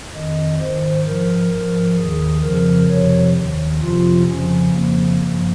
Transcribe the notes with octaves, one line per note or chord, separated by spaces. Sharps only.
F2 D#3 D#5
G#2 D#3 C5
G#2 F3 A#4
G#2 F3
D#2 D#3 G#4
F2 C#3 F3 A#4
F2 C3 F3 C#5
D#2 D#3
F2 C3 F3 F4
F2 C#3 F3 C#4
F2 C#3 F3 A#3
G2 F3